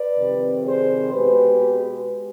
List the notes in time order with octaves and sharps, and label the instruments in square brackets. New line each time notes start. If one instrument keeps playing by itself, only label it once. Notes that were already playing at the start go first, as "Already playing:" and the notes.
Already playing: [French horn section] B4 D5
F2 C3 D#3 G3
G#4 C5
B2 G#3 G4 B4